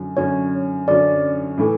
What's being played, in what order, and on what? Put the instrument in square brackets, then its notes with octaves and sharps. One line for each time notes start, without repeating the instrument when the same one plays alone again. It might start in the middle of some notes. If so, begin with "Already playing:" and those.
Already playing: [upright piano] F#2 D3 F#3
[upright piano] F#2 D3 F#3 C#4 [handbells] C#5
[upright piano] F#2 D3 F#3 C#4 [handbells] D5
[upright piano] A2 E3 A3